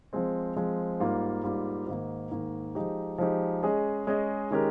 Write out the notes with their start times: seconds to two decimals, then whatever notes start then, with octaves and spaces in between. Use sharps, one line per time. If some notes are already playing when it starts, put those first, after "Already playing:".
0.13 F3 G#3 C4
0.56 F3 G#3 C4
1.00 G#2 G3 A#3 F4
1.44 G#2 G3 A#3 F4
1.87 G#2 D#3 A#3
2.31 G#2 D#3 A#3
2.75 F3 G#3 D#4 G4
3.18 F3 G#3 D#4 G4
3.63 G#3 C#4 G#4 D#5
4.07 G#3 C#4 G#4 D#5
4.51 D#3 G#3 C#4 G4 A#4